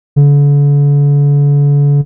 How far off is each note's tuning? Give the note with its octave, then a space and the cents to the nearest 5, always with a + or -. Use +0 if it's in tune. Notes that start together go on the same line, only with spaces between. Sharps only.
D3 -40